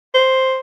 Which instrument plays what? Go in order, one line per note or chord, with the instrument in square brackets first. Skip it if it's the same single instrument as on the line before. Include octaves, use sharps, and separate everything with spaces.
[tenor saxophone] C5